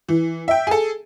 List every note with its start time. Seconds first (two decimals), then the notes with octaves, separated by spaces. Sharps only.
0.09 E3
0.48 E5 G5
0.67 G#4 A4